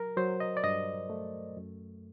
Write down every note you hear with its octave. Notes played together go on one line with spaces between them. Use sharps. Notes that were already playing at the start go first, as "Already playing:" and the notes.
Already playing: F#3 A#4
F#3 C5
D#5
D5
G2 D#5
A3
F#2